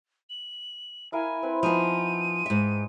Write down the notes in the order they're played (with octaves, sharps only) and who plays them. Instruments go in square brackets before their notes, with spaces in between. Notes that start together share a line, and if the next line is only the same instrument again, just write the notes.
[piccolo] F#7
[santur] E4 A#4 F5 [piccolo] G#5
[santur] C4 B4
[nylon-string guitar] F3 B3 [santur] D#4 G#5 C6 [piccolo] D#7
[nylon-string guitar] G#2 E5